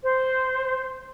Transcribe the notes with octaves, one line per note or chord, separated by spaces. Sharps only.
C5